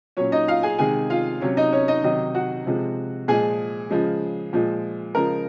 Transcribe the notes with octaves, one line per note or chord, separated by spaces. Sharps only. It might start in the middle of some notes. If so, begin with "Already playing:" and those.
A#2 F#3 C#4 C#5
D#4 D#5
F4 F5
G#4 G#5
C3 D#3 G#3 G#4 G#5
F4 F5
C3 F#3 C#4 C#5
D#4 D#5
C#4 C#5
D#4 D#5
C3 D#3 F#3 D#4 D#5
F#4 F#5
C3 F3 G#3
A#2 F3 G#3 G#4 G#5
C#3 F3 G#3
A#2 F3 G#3
C#3 F3 G#3 A#4 A#5